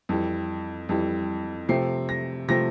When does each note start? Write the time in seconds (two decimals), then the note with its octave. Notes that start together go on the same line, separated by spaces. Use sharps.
0.09 F2 E3 G3
0.89 F2 E3 G3
1.69 C3 F3 A3 C4 C7
2.09 A#6
2.48 C3 F3 A3 C4 A#6